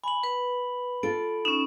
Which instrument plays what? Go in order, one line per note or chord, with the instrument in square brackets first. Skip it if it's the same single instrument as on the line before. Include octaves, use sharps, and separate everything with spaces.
[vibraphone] G#5 [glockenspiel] B5 F#7
[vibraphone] B4
[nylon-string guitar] F4 A4 [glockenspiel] D7
[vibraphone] C#4 D#4 [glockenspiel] E7